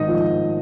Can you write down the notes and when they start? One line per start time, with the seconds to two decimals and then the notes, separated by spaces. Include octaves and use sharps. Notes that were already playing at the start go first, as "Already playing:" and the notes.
Already playing: G#1 G#2 D#4 D#5
0.08 F3